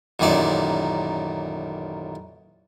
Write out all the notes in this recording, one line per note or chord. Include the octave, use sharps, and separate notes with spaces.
A1 F#2 A#2 D#3 D5